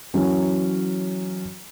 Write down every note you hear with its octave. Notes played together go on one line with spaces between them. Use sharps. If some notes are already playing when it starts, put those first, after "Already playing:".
E3 F#3 C#4